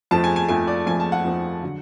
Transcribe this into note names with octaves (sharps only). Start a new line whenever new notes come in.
F2 F3 A3 A5
G#5
G#5
F2 F3 A3 G#5
D5
F2 F3 A3 G#5
A5
F#5
F2 F3 A3
D3 F#3